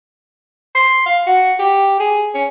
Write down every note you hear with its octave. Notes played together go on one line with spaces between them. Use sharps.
C6
F5
F#4
G4
G#4
C#4